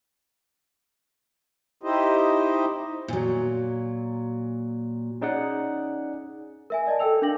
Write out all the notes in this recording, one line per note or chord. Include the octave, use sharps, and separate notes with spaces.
D#4 E4 G4 C5 D#5
A#2 F#3
C#4 D#4 G#4 D5 F#5
A#4 E5 G#5
D5 D#5 A5
A4 A#4 G5 E6 F7
D4 F5 D6 A#6 F#7